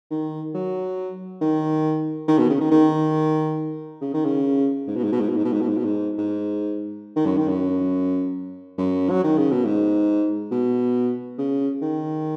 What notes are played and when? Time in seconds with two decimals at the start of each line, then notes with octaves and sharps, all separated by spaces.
0.11 D#3
0.55 F#3
1.41 D#3
2.28 D#3
2.39 B2
2.49 C#3
2.61 D#3
2.71 D#3
4.01 C#3
4.14 D#3
4.25 C#3
4.88 G#2
4.97 B2
5.04 G#2
5.12 B2
5.21 G#2
5.29 B2
5.37 G#2
5.45 B2
5.53 G#2
5.61 B2
5.69 G#2
5.77 B2
5.85 G#2
6.18 G#2
7.16 D#3
7.26 F#2
7.37 D#3
7.48 F#2
8.78 F#2
9.10 F#3
9.24 D#3
9.38 C#3
9.52 B2
9.65 G#2
10.51 B2
11.39 C#3
11.82 D#3